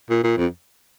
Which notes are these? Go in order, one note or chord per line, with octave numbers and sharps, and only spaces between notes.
A#2
A#2
F2